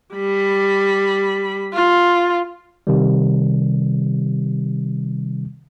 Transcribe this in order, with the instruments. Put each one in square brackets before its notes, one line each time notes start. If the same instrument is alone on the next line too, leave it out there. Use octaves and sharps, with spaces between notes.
[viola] G3 B5
F4
[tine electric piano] C3 D#3 G3